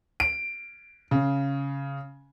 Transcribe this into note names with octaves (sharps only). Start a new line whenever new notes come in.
D7
C#3